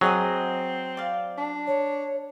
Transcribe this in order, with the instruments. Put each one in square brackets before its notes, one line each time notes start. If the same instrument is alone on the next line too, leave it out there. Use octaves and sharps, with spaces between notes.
[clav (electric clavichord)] F#3 [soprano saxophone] C4 [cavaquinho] G#4 D#5 F#5
[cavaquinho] D5 F5
[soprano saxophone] D4
[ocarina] C#5